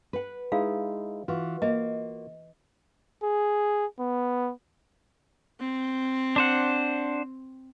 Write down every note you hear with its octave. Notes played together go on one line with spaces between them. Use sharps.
B4 F#5
G#3 D#4 E4 F5
E3 F4 F#4
A#3 D#5
G#4
B3
C4
D4 C5 F#5